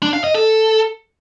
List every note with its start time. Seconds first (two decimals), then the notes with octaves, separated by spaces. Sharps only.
0.03 D4
0.13 F5
0.24 D#5
0.34 A4